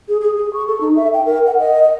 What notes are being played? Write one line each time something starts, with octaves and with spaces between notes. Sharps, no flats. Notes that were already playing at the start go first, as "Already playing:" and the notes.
G#4
G#4
G#4
C#6
A4
D#4
E5
G5
A#4
F#5
D#5
D#5